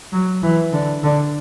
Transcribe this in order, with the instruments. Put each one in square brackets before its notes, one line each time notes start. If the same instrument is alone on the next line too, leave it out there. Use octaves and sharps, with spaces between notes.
[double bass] F#3
E3
D3
D3